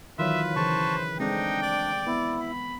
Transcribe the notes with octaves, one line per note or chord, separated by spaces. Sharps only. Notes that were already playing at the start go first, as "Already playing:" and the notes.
D#3 E3 F#3 F4 B4 E5
C#3 E3 C5 A5 C#6
G#3 A3 C4 D4 D#4 G5
D5
B3 E4
B5